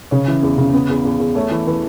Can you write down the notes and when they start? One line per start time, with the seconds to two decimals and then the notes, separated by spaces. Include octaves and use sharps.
0.11 C#3 C#5
0.28 E3
0.43 E2
0.58 C#3
0.73 B3
0.90 E2
1.05 E2
1.20 E2
1.35 A3 C#5
1.51 E3
1.67 E3 B4